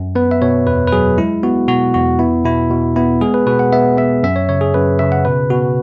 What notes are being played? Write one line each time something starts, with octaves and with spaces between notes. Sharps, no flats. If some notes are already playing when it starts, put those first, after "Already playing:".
Already playing: F#2
B3 B4
E5
B2 C#5
E2 B4
B4
F#3 G#4
G#3 E4
B3 F#4
B2 F#4
E2 F#4
B3 E4
B2 E4
B2
B3 E4
G#3 G#4
B4
B2 B4
F#5
B3 E5
B3 E5
F#2 E5
C#5
C#3 C#5
G#4
F#2 B4
C#3 E5
F#5
B2 B4
B2 F#4